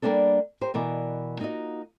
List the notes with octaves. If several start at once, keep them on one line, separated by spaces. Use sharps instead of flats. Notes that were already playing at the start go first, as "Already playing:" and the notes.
G3 A#3 B3 C#4 D4 A4
G4 A#4 C5
B2 E3 A#4 D5 D#5
A#3 D#4 F4 F#4 D#5